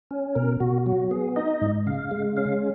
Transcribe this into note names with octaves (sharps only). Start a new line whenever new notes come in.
C#4
B2 A#4
B2 F#4
F#3 F#4
B3 G#4
D#4 D#5
G#2
C#3 F5
G#3
C#4 F5